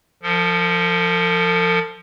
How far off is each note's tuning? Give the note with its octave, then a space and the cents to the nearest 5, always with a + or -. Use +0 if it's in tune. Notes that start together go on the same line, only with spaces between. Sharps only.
F3 +0 A4 +45